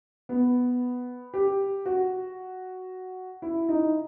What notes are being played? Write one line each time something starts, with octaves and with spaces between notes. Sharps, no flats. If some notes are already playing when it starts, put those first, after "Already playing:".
B3
G4
F#4
E4
D#4